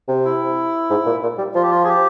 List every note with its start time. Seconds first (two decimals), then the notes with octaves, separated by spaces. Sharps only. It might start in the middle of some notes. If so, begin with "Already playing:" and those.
0.08 C3
0.25 E4
0.91 G#2
1.06 A#2
1.23 A#2
1.38 G3
1.55 F3 F4
1.63 G4
1.71 F4
1.84 G#4
1.88 G4